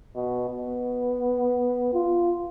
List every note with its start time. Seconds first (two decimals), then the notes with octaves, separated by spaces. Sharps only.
0.16 B2
0.50 B3
1.94 F4